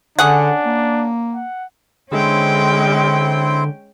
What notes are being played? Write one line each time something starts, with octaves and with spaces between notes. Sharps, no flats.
D3 C#4 D4 G#4 F#5
A#3
F#5
D3 G#3 C4 C#4 E4 C5 G5